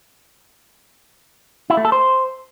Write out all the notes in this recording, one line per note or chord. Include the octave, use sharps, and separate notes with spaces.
E4
A3
A4
C5